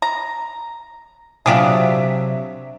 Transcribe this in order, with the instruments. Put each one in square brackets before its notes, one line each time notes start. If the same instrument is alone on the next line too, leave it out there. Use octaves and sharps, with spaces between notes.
[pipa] A#5
[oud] C3 F#3 D4 [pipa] F4 G4 G#4 [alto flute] E5